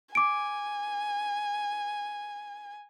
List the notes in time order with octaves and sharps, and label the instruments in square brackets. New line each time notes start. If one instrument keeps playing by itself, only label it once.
[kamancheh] G#5 [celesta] D6 D7